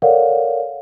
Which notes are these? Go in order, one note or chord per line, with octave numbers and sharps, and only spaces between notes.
A4 A#4 C#5 D5 F5 F#5